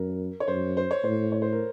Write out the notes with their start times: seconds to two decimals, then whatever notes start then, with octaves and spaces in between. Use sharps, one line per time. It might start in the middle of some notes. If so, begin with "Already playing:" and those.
Already playing: F#2 A#4
0.40 C#5
0.48 F#2 C5
0.77 C5
0.91 C#5
1.04 A2 C5
1.32 C#5
1.42 C5
1.52 A#4